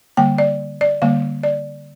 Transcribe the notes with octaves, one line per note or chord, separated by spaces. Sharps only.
D3 G3 A#3 G5
D5
D5
D3 G3 A#3 F5
D5